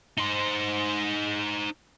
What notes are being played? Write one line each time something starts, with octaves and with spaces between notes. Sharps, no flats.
D#4 C5